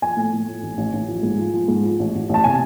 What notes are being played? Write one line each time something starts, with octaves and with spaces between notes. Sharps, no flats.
F3 G#5
A2
A2
F3
A1
A1
A1
F3
G#2
F3
F3
G#2
F3
A1
A1
A1 A5
C3 G#5